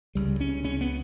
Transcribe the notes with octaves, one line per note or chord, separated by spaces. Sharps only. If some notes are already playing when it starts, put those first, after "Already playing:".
C#2 C#3 G3
C#4
C#2 C#3 C#4
B3